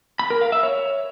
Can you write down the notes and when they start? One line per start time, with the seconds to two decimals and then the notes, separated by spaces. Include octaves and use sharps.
0.19 B5
0.30 A#4
0.41 F5
0.52 E5
0.63 C#5